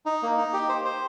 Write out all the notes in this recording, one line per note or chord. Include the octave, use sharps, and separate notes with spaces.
D#4
A#3
D#4
G4
C5
C5